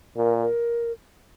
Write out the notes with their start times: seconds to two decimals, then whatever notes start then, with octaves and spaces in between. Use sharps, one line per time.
0.17 A#2 A#4
0.41 A#4